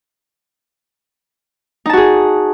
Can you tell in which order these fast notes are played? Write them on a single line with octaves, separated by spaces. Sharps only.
D#4 A5 F#4 G#4